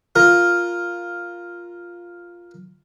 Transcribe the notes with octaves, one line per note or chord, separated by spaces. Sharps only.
F4 A#4